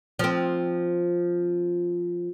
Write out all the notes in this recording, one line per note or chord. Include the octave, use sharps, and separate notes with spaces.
F3 C4